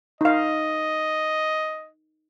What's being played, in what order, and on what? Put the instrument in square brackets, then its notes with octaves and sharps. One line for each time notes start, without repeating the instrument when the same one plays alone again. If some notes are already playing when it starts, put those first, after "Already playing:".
[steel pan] D#4 F5 [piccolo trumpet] D#5